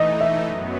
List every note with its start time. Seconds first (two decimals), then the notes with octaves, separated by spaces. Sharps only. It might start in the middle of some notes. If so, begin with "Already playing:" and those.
Already playing: E3 A3 D#4 D#5
0.21 E5
0.46 F#2 F#3 B3